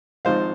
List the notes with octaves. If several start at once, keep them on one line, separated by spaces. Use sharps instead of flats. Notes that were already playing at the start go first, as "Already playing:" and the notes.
G#1 G#2 F3 G#3 D#4 C5 F5